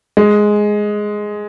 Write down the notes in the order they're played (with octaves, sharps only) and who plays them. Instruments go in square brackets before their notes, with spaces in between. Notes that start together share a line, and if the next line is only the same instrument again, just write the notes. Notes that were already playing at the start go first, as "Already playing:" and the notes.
[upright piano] G#3